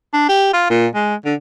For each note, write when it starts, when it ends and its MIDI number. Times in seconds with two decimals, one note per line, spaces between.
0.14 0.27 62
0.29 0.50 67
0.53 0.65 65
0.70 0.87 46
0.95 1.14 56
1.25 1.35 50